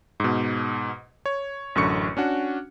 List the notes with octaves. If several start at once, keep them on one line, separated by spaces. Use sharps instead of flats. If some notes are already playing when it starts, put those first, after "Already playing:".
G#2 B2
C#5
A1 F#2 D3 C#6 C#7
C#4 D4 F#4